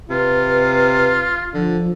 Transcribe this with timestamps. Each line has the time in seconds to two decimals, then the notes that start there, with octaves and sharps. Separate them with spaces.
0.10 C3 F4 B4
1.54 D3 F3